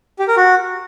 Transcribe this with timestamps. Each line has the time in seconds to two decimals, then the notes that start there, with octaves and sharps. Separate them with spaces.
0.19 G4
0.28 A#4
0.37 F#4